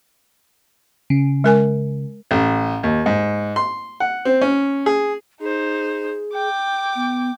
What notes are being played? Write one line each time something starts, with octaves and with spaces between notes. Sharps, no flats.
C#3
G#3 A#4 G#5
A1
D#2
G#2
C6
F#5
C4
C#4
G#4
D#4 G#4 C5
G5 D6
B3